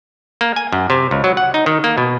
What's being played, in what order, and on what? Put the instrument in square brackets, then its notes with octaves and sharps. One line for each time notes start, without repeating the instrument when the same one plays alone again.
[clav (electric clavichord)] A#3
G#5
F#2
C3
C#2
F#3
F#5
D#4
D#3
A#3
B2